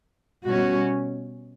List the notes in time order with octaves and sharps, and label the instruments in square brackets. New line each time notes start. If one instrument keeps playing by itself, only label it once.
[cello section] B2 G3 C#4 F#4